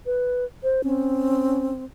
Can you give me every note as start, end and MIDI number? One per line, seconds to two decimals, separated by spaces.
0.06 0.45 71
0.63 0.82 72
0.84 1.84 60
0.84 1.71 61